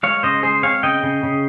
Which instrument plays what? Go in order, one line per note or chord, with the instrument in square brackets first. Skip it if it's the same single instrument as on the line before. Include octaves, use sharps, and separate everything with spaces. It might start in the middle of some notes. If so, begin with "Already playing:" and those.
[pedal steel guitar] G#3 C#5 F5
C#3 C5 D#5
G#3 G#4 C5
C4 C#5 F5
C#3 D#5 G5
C#3
C#3